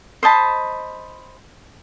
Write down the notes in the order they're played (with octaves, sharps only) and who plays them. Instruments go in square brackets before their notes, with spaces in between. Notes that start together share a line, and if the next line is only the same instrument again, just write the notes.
[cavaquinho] C5 D#5 A5 B5